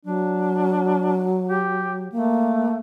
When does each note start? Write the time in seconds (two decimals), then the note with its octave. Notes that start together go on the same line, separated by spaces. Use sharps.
0.05 F#3 D4
1.49 G4
2.12 A3 A#3